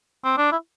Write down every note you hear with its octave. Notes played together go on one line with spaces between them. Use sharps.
C4
D4
E4